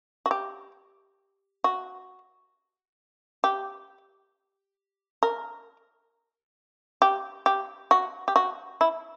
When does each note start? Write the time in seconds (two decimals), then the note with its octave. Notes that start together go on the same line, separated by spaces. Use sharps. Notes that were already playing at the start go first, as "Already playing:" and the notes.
0.26 F#4
0.31 G4
1.64 F#4
3.44 G4
5.23 A#4
7.02 G4
7.46 G4
7.91 F#4
8.28 G4
8.36 F#4
8.81 E4